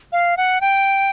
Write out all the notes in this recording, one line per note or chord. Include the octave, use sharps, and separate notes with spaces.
F5
F#5
G5